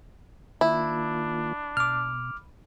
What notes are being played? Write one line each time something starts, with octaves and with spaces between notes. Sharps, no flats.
D#3 A#3 D4 E4 F4
B2 D6 F6